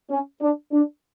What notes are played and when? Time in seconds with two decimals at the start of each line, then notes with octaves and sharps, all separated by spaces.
0.10 C#4
0.41 D4
0.72 D4